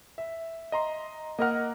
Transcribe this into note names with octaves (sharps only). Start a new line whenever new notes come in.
E5
D#5 A#5 C6
A#3 A#4 D#5 F#5 F6